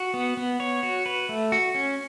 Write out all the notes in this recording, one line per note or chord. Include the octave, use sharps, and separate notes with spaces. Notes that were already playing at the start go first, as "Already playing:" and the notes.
Already playing: F#4
B3
B3
C#5
F#4
B4
A3
F#4
C#4